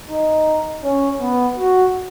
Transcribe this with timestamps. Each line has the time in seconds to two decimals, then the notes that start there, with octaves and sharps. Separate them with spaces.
0.08 D#4
0.83 C#4
1.20 B3
1.57 F#4